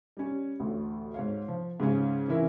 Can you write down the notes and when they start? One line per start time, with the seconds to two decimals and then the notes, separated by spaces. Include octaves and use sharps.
0.17 G3 C#4
0.60 A1 D2
1.14 G#2 C#5 F5
1.48 F3
1.80 G#2 C#3 C#4
2.28 C3 E3 C#4 E4 A#4